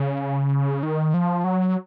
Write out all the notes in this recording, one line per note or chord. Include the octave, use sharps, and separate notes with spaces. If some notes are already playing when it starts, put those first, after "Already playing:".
Already playing: C#3
D#3
F3
F#3